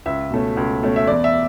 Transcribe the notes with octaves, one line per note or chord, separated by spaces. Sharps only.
C#2 E5
B2 A3 C#4
C#2
B2 A3 C#4
E5
E2 D5
E5